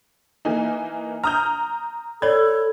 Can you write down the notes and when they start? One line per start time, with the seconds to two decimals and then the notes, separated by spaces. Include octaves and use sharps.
0.45 E3 A#3 D#4
1.24 A#5 D#6 F6 G6
2.22 A4 C#5 D5 B5 G#6